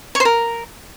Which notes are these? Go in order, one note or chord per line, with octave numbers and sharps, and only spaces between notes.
C#5
C5
A#4